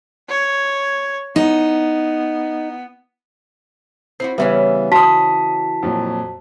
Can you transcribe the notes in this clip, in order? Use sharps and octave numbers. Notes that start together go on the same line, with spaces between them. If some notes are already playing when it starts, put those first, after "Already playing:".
C#5
B3 D#4
C4 E4 F#4 C7
C#3 E3 G3 B3 C#4 E5
F#4 A5 C6 D#6 B6
F2 A#2 F#3